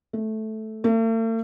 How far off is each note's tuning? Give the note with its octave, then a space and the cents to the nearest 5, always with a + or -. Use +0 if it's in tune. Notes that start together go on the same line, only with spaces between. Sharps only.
A3 -10
A3 +45